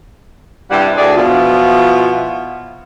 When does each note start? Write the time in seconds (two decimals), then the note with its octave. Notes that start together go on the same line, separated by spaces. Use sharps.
0.71 G2 C3 G3 E4 F#5
0.98 D2 G#4 D5
1.15 B2 F3 E4 F4